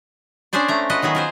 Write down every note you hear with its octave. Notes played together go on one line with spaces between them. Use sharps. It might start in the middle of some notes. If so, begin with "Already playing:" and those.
C#4 D4 G#4 C5 D5
A3 A#5
F4 F#4 B4 D#5
D#3 F#3 B3 G#4
F4 A#4 C5